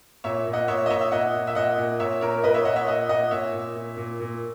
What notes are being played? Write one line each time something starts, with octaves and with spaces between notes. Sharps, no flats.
A#2 C#5 E5
A#2
D#5 F#5
A#2 C#5 E5
D#5
A#2 C#5 E5
E5
A#2 D#5 F#5
A#2
E5
A#2 D#5 F#5
A#2
A#2 C#5 E5
A#2 A#4 C#5
A#2 B4 D#5
C#5 E5
A#2 D#5 F#5
C#5 E5
A#2 D#5 F#5
A#2 D#5 F#5
A#2 C#5 E5
A#2
A#2
A#2
A#2